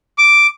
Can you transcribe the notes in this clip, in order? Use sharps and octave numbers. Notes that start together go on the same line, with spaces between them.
D6